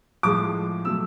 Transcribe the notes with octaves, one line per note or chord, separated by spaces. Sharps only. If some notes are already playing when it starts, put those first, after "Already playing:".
A2 F3 G#3 D6
B2 F#3 A3 E6